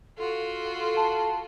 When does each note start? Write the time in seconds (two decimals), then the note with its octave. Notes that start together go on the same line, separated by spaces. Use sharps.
0.18 F4 F#4 A4
0.97 A5